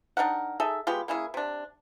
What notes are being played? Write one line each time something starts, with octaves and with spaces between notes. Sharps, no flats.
D4 D#4 A#4 F#5
D#4 G#4 A4 E5
G#3 B3 F4 G4
A#3 C#4 E4 G#4
C3 D4